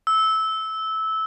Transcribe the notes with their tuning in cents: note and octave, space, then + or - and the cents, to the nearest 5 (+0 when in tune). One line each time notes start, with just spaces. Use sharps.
E6 -15